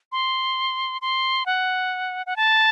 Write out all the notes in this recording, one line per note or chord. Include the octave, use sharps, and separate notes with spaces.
C6
C6
F#5
F#5
A5